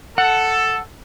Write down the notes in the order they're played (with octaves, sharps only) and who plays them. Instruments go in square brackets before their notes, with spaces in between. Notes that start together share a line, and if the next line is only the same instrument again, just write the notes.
[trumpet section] A4 [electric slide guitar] F#5